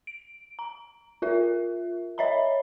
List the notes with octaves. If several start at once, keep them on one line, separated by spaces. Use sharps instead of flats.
D7
A#5
F4 A#4 E5
C#5 D#5 E5 A#5 B5